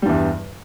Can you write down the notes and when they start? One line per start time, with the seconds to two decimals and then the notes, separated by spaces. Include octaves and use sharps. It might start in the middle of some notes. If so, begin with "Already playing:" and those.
0.02 G3
0.06 G2
0.09 E2